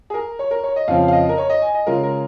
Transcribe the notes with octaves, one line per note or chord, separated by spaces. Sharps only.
G#4
A#4
C#5
A#4
C#5
D#5
F2 C#3 F3 F5
F5
D#5
A#4
C#5
D#5
G#5
D#5
C#3 G#3 F4 A#4
A#4